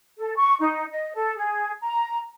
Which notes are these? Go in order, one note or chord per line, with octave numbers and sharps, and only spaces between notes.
A4
C#6
D#4
D#5
A4
G#4
A#5